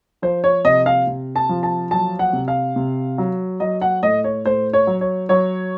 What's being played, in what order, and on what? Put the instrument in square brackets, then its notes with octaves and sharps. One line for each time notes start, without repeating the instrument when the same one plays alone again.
[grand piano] F3 C5
C#5
C3 D#5
F5
C3
A5
F3
A5
F#3 A5
F#5
C3
F5
C3
F#3
F#3 D#5
F#5
A2 D#5
C#5
A2 C5
C#5
F#3
C#5
F#3 C#5